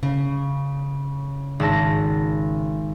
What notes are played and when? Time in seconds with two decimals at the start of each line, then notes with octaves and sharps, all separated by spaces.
0.03 C#3
1.60 G#1 A5 A#6